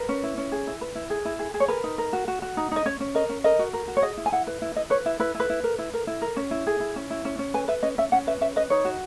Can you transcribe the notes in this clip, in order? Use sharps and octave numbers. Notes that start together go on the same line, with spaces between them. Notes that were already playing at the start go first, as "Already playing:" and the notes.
Already playing: A#4 B4
C#4
E4
C#4
G#4
E4
B4
E4
G#4
E4
G#4
G#4
C#5
A#4 B4
D#4
A#4
F#4
F#4
F#4
D#4
D#4 D#5
C#4 C#5
C#4
A#4 D#5
C#4
A#4 D#5
F#4
A#4
F#4
C#5
G#4 D#5
E4
G#5
E4 F#5
B4
E4
E4 D#5
B4 C#5
E4 E5
E4 B4
E4
B4
E4
A#4
E4
A#4
E4
A#4
C#4
E4
G#4
E4
C#4
E4
C#4
C#4
B4 G#5
B4 E5
C#4 D#5
C#4 E5
C#4 F#5
B4 E5
C#4 E5
B4 D#5
D#4 C#5
F#4